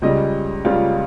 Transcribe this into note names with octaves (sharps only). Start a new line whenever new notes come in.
C#2 C#3 G3 D#5
C#2 C#3 G3 F4